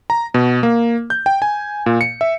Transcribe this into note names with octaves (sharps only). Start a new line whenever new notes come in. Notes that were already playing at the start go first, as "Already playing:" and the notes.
A#5
B2
A#3
G6
G5
G#5
A#2
C#7
E5